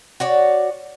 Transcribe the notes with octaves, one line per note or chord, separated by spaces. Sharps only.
F#4 C#5 D5